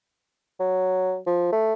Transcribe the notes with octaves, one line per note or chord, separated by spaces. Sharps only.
F#3
F3
A3